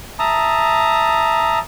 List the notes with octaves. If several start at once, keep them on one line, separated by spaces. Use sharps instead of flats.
E5 A5 A#5 D#6